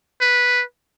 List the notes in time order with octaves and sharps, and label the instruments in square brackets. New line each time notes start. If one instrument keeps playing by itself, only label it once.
[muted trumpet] B4